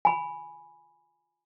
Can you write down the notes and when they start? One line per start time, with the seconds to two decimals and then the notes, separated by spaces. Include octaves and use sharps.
0.05 G#5 B5